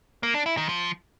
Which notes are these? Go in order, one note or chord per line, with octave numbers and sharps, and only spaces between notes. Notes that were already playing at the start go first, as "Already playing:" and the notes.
A#3
D4
E4
D#3
F3